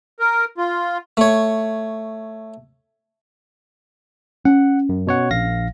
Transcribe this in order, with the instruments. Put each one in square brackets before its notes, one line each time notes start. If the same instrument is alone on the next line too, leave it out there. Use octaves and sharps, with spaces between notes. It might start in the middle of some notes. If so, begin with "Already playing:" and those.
[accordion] A#4
F4
[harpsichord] A3 C#5
[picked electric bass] C#4 [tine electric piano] F#5
[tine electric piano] F#2
B2 C#5 F#5
A#1 F5 A#6